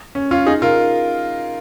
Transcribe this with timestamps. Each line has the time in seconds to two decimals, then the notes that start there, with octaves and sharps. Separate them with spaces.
0.15 C#4
0.31 C#4 F4
0.46 D#4 G#4
0.62 F4 A#4